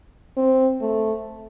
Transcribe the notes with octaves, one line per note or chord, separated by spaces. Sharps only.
C4
A3